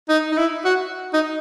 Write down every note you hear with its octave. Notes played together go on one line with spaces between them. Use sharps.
D#4
D#4
E4
F#4
D#4